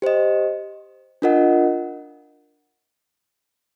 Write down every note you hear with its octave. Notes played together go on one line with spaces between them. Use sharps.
G4 C5 D#5
D4 F4 A#4 D#5 F#5